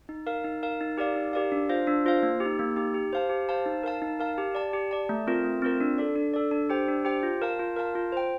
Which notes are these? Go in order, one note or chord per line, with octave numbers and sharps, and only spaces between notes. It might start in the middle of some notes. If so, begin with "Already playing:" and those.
D#4
A#4 F5
D#4
A#4 F5
D#4
G4 A#4 D5 F5
D#4
G4 A#4 D5 F5
D4
F4 C5 F5
D4
F4 C5 F5
A#3
G4
D#4
A#3
D#4 G4
G4
C5 F5 A5
G4
C5 F5 A5
D#4
A#4 F5 A5
D#4
A#4 F5 A5
G4
D5 A5
G4
D5 A5
A3
C4 F4 A#4
A3
C4 F4 A#4
D4
A4 D5
D4
A4 D5
D4
G4 C5 G5
D4
G4 C5 G5
F4
A#4 F5 A5
F4
A#4 F5 A5
F4
C5 G5